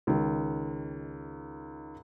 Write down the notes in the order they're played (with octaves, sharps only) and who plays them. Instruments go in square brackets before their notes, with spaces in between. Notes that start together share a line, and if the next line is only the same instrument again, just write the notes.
[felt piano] C#2 D#3